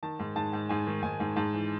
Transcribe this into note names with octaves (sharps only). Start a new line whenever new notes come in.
D#3 A5
G#2
G#2 A5
G#2
G#2 G#5
D#3
G#2 G#5
G#2
G#2 A5
E3